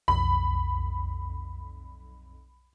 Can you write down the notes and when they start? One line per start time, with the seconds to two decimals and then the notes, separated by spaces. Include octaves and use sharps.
0.08 B1 F2 B5